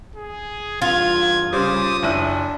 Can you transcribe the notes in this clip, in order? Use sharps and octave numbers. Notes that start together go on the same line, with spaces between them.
G#4
E2 G2 F4 G#6
C#3 G3 C5 D6 D#6
F#1 D4 E4 D#7